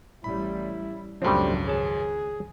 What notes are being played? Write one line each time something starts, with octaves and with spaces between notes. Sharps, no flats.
A1 G3 E4 B5
G#1 C#2 F#2 F3 G3 A3 C4 D4
G#4 C#5 A5